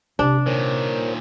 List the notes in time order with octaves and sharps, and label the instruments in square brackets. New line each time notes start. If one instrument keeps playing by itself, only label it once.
[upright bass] C3 C4 [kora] D4 [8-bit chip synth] G4
[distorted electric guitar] A#2 D#3 [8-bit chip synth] A#4 C5 C#5